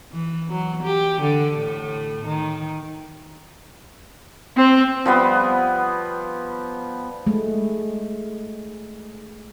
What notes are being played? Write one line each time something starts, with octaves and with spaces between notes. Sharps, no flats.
E3
F#3
G4
D3
A2
D#3
C4
F3 G3 B3
G#3 A3